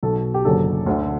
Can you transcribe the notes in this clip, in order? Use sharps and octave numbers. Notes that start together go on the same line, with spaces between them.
B1 B2 A4
G4
F#1 F#2 D3 A4
D2 D3